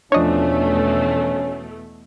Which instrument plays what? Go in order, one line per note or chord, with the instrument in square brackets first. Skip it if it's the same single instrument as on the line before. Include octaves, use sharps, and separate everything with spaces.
[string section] E2 B2 A3 [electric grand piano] F3 D4 [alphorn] C#4 [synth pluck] C#5 D#5